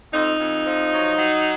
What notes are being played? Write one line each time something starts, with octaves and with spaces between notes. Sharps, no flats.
F2 D#4
F2
F3
F#3
F#3